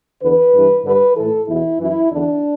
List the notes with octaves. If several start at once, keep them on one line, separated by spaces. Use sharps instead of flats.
E2 D3 B4
G2 E3
G2 D3 B4
A2 E3 A4
E2 B2 E4
F#2 E3 E4
E2 D3 D4